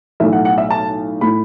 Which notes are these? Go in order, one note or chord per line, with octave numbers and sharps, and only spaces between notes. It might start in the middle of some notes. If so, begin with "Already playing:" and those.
B1 A2 A3 E5
F#5
F#5
E5
A5
A2 A3 B5